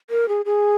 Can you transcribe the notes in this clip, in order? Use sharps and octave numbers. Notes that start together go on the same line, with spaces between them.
A#4
G#4
G#4